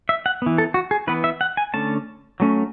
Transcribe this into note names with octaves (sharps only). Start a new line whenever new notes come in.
E5
F#5
E3 B3
A4
F#4
G#4
E3 B3 B4
E5
F#5
G#5
D3 A3 C#4 A5
F#3 A3 C#4